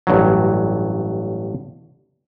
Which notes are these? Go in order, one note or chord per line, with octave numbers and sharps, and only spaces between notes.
A1 G2 F#3